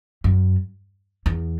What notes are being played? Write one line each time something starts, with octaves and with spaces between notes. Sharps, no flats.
F#2
E2